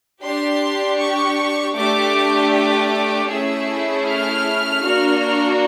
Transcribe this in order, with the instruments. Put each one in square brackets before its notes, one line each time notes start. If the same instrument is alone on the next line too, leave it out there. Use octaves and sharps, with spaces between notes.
[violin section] D4 G4 C6
C#6
A3 D4 G4 D6
D6
A3 C#4 E4 G#4 E6
F6
A#3 D4 F#4